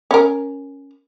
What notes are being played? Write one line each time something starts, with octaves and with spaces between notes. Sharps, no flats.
C#4 A#4